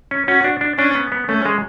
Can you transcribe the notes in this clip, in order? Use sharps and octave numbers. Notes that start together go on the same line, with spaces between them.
C#4
C#4 F#4
D4
D4
C#4 D4
B3
B3
A3 C#4
G#3